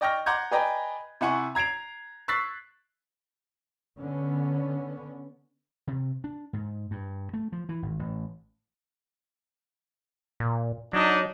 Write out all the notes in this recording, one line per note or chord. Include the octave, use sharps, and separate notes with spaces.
D5 D#5 G5 C#6 F6 A#6
F#5 A#5 C6 D6 G6 G#6
G#4 B4 D5 D#5 G5 A#5
C3 E4 F#5 G#5 C#6
A#5 G#6 C7 D7 F7
C#6 E6 F#6 A6 B6 C7
D3 B3 C#4
C3
D4
G#2
G2
A3
F3
E3
G#1
A1
A#2
F#3 D4 D#4 D#5